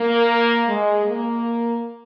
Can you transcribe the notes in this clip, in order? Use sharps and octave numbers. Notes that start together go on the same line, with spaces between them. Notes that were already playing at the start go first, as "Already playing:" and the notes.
Already playing: A#3
G#3
A#3